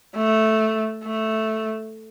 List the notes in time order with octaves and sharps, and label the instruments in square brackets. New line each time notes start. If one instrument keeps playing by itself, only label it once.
[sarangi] A3
A3